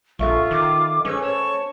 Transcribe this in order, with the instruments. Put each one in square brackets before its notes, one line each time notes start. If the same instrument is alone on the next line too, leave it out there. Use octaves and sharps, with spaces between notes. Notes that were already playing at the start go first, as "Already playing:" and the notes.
[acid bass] A#1 [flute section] F4 [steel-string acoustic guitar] A4 E5 F5 [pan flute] C#6
[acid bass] D#3 [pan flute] D6
[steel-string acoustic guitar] A3 C5 [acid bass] C#4 [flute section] G#4 C#6 E6 [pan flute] B4
[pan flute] C#5 [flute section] A5 C#6